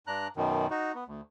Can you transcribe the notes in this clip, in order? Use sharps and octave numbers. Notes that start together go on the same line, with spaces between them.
G2 D4 A#5 F#6
F#2 B2 D#3
D#4 F#4
B3
D2